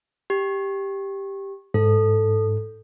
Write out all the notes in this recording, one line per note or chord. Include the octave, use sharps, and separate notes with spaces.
G4
G#2 A4